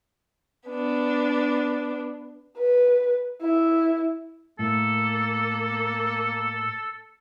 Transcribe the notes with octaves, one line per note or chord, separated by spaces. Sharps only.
B3 D4
B4
E4
A2 A#3 A4